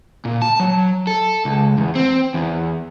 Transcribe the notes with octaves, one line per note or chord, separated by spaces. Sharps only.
A#2
A5
F#3
A4
C#2
E2
C4
E2